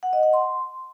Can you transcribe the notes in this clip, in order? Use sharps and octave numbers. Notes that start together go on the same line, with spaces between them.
F#5
D#5
F#5
C6